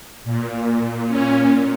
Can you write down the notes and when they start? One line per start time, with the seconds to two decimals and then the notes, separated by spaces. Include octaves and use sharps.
0.24 A#2
1.08 C#4